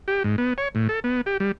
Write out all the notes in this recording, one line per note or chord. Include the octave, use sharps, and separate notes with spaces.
G4
G#2
B3
C#5
A2
A4
B3
G4
G3